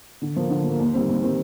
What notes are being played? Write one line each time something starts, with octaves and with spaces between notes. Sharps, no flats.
D3
F3 A#3
D3
F3 A#3
D#2
D#3 G3 C4
D#2
D#3 G3 C4